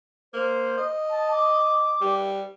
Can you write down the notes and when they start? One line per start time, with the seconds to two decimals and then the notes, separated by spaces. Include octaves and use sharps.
0.34 A#3 C5
0.78 D#5
1.10 A5
1.31 D6
2.01 G3